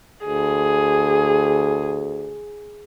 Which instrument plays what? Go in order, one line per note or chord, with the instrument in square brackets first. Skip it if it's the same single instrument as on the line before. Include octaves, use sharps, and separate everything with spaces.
[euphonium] D2 [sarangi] G#4